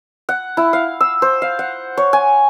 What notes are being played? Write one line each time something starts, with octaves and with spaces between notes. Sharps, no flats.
F#5
E4
F5
E6
C5
F5
F#5
C#5
G#5